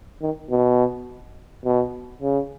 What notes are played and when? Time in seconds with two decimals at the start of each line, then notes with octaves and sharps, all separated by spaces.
0.22 D#3
0.50 B2
1.65 B2
2.22 C#3